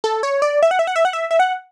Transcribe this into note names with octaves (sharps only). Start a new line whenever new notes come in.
A4
C#5
D5
E5
F#5
E5
F#5
E5
F#5
E5
E5
F#5